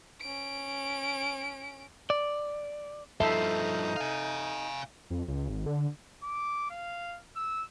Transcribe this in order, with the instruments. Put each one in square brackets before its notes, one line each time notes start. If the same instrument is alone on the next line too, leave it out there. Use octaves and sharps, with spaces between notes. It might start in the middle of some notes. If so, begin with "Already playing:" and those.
[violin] C#4 D7
[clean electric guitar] D5
[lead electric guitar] G2 F3 [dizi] D#4 [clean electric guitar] A4 C5 A5 [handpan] E5
[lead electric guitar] F5 G#5
[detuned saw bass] F2
C#2
G#1
D3
[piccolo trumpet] D6
F5
E6